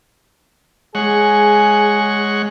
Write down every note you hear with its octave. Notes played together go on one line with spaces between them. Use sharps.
G#3 G#4 C#5 F#5